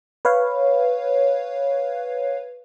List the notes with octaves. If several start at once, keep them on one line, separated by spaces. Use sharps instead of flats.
B4 C#5 F5